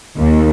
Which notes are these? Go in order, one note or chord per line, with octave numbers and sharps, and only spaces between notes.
D#2